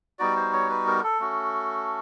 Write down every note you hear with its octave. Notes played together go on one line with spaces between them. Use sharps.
G3 B3 D#4 F#4 D5
C5
C#5
B4
A#4
A4
A3 C#4 F#4